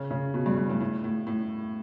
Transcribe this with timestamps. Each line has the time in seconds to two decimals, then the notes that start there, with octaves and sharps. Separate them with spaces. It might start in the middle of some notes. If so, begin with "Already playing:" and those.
Already playing: C#3
0.11 C#3
0.34 B2
0.46 G2
0.58 G2
0.69 A2
0.80 A2
1.04 A2
1.27 A2